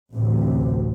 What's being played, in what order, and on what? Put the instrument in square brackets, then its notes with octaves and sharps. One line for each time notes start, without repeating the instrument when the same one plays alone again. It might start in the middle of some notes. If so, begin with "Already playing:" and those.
[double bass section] A1 D2 A2 C3